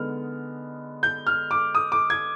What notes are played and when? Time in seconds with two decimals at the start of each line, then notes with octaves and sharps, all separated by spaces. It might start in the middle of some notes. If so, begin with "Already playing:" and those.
Already playing: D3 G#3 B3 D#4 F6
1.03 G6
1.27 F6
1.51 D6
1.75 D#6
1.92 D6
2.10 G#6